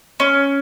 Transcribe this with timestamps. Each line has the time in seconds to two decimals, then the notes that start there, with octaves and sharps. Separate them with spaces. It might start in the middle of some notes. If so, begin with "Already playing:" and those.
0.20 C#4